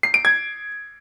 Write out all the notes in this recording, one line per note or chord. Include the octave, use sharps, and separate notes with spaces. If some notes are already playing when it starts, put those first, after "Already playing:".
C7
D7
G#6